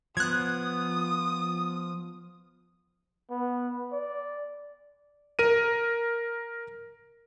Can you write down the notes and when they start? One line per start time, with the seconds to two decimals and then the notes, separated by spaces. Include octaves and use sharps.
0.17 F3 B3 D#6 F#6 G#6
3.30 B3
3.92 D5
5.39 A#4 D#7